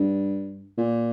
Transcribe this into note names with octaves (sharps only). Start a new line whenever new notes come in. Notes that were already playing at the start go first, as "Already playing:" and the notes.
Already playing: G2
A#2